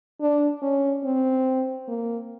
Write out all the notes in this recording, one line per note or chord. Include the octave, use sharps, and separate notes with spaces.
D4
C#4
C4
A#3